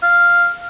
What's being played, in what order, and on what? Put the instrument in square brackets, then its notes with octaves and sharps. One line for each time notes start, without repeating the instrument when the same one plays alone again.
[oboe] F5